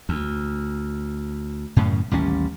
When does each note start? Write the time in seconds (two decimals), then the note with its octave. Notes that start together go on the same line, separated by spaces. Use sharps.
0.09 D2
1.76 F#2 A2 C#3
2.11 A1 D#2 G3 C#4